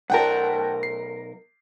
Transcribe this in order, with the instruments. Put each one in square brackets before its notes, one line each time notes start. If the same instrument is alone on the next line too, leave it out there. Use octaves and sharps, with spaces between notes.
[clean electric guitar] B1 A#4 [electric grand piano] F#5 G5 A5
[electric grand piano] C7